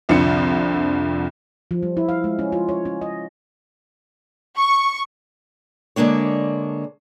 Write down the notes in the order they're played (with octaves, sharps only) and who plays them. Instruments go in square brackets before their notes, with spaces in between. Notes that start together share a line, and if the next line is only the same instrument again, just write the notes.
[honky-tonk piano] C2 F2 D3 F3 C#7
[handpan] F3
G3
E4
F5
G#3
C#4
F4
C#5
C#4
D#5
[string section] C#6
[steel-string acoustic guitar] D3 G#3 A#3 D4 C#5